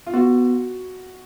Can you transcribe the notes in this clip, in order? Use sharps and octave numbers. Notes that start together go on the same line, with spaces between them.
F4
B3 F#4